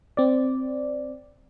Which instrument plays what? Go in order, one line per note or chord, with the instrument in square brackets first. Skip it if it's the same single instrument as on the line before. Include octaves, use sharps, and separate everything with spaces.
[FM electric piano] C4 D5